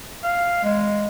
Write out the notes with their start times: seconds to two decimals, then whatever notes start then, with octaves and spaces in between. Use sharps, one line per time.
0.23 F5
0.63 G#3